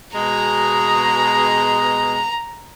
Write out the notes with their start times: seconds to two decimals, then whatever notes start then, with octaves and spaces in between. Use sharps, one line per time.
0.15 B2 G#3 A#5